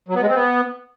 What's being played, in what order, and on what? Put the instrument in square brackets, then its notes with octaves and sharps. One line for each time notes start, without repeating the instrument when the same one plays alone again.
[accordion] F#3
B3
G#3
C4
B3